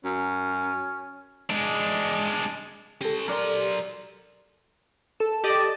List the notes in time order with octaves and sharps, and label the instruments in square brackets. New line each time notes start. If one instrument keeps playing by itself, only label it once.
[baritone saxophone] F#2 [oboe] C#4
[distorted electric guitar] G#3 D4
[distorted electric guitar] C#4 C6 [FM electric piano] G4 A4
[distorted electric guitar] F#3 C6 [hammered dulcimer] A#4 D5
[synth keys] A4 E7
[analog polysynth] G4 D5 D#5